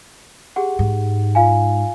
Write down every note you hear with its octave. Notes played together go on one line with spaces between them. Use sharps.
G4 G#4 F#5
G#2
F4 F5 G#5